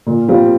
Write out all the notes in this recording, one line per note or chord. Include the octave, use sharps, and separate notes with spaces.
A#2
G3 C4 F4